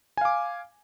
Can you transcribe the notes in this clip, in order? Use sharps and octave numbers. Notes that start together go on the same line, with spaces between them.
F5 G#5 D6